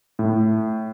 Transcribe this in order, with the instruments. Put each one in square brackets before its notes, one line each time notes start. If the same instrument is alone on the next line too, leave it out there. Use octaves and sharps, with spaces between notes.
[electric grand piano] A2